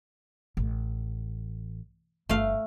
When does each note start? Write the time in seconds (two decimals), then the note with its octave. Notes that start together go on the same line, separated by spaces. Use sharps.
0.57 A1
2.29 G1 G2 A3 F5